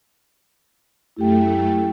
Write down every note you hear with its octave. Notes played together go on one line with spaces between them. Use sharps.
F#2 A3 E4 G4 G5